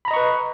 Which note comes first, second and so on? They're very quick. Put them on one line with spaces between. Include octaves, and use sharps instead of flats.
B5 A#5 D#5 C#6 B4